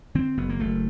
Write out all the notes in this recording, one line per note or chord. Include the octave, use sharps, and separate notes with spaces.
D3 C4
F#1 B3
A#3
F#1 A3